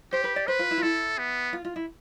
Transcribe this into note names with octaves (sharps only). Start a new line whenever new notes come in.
G4 C5
B4
D5
B4 C5
F4
E4
F4
E4 A4
B3
F4
F4
E4